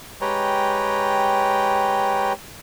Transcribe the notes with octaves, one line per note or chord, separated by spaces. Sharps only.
G#3 G4 B4 C#5 G5 A#5